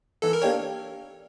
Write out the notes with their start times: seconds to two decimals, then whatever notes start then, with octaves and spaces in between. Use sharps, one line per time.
0.22 E3 A4
0.33 A#4
0.42 A#3 D4 G4 C#5